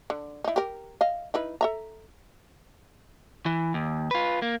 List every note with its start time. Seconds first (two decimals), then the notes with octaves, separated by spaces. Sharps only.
0.10 D3
0.44 D#4 E4
0.56 G4 A#4
1.01 D#5 F5
1.34 D#4 E4 B4
1.61 A4 E5 A#5
3.46 E3
3.74 D#2
4.11 F4 B4
4.42 A#3